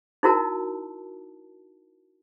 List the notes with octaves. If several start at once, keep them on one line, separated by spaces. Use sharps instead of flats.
D#4 E4 F#4 A#4 A5